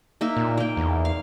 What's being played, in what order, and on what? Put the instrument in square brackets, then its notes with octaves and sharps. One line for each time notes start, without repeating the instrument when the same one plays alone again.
[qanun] A#3 D#4 E5
[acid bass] A#2
[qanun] A#3 G5
[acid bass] E2
[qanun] F5